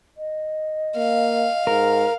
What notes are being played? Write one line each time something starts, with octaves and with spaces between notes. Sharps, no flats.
D#5
A#3 F5
G#2 A#4